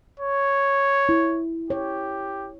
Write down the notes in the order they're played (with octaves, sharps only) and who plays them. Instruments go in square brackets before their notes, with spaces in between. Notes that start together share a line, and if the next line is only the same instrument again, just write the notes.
[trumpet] C#5
[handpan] E4
[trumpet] G4 [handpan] C#5